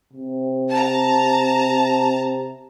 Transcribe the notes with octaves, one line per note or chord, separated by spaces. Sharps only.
C3
A5 A#5